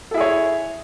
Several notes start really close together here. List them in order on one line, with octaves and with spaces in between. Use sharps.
A4 E4 G#4 C#5